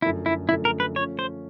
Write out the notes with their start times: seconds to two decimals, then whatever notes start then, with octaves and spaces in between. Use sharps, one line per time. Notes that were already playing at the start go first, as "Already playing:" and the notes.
0.02 F#2 D3 F3 A3 E4
0.26 E4
0.49 F#2 D3 F3 A3 E4
0.65 A#4
0.80 B4
0.96 F3 A3 C#4 C#5
1.19 C5